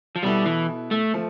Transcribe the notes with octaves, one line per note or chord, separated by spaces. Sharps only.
F3
B2 G3 B3 E4 A4
E3
A3
F3 A3